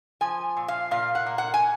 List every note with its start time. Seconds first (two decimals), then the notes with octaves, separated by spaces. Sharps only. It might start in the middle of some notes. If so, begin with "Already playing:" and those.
0.21 F3 G#5
0.57 A#2
0.68 F5
0.91 A#2 F5
1.15 F#5
1.26 A#3
1.38 F#5
1.54 G#5